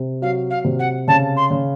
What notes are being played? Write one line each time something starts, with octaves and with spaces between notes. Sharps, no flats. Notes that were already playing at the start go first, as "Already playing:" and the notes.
Already playing: C3
F#3 F5
F5
C3
F#5
C#3 A5
C6
C#3